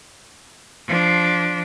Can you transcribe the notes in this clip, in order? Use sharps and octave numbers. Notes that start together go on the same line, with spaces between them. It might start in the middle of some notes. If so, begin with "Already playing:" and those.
F3 D4